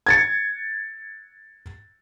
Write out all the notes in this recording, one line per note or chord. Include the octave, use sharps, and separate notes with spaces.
G#6 A6 C#7